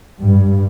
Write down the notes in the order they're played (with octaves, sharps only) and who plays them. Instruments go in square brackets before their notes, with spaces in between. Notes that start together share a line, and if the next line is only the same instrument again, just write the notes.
[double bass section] G2